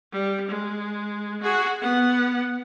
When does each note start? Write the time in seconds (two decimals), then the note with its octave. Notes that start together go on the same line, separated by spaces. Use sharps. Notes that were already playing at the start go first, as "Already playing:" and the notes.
0.12 G3
0.48 G#3
1.43 F#4 G#4
1.81 B3 F#5